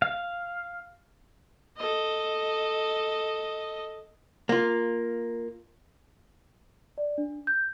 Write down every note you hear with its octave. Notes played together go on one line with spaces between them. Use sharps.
F5
A4 D#5
A#3 F4
D5
D4
G6